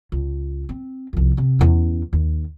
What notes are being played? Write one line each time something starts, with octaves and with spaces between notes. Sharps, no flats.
C#2
C4
C2 F2
C3 C4
E2 C#4
D#2